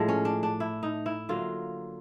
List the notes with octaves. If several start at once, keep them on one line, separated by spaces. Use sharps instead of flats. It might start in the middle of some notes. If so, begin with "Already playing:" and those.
Already playing: A2 F3 G#3
C#4
D4
D4
E4
D#4
E4
D3 F#3 A#3 F4